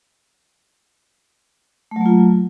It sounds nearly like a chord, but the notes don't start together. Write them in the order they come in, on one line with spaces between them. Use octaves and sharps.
A3 F#3 A#3 F4